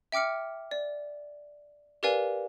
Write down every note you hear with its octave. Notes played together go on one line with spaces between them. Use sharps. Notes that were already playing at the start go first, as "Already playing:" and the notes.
E5 G5 D6 F6 C#7
D5
G4 A#4 B4 D5 F5 G#5